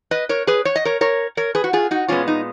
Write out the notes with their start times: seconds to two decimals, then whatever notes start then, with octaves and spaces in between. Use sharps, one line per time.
0.11 B4 D#5
0.29 A#4 C#5
0.47 G#4 B4
0.65 C#5
0.76 D#5
0.85 A#4 C#5
1.01 A#4 C#5
1.37 A#4 C#5
1.55 G#4 B4
1.64 F#4
1.73 F4 G#4
1.91 D#4 F#4
2.08 A#2 G#3 B3 C#4 F4
2.28 D#4